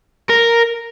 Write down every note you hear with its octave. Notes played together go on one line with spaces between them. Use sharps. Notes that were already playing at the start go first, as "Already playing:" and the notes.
A#4